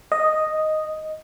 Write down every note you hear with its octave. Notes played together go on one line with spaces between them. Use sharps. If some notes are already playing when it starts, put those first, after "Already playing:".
D#5